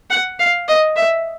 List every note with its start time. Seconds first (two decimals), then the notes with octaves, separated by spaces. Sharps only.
0.10 F#5
0.39 F5
0.68 D#5
0.96 E5